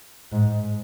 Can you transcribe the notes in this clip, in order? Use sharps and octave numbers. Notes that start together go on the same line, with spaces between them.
G#2